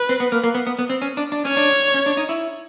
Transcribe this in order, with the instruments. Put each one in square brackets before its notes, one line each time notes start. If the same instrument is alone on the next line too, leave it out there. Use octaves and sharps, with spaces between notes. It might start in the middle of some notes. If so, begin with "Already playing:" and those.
Already playing: [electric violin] B4
[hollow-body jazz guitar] C4
B3
A#3
A#3
B3
B3
B3
C4
C#4
D4
D4
[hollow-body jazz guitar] C#4 [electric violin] C#5
[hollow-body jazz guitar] D4
C#4
D4
D#4
E4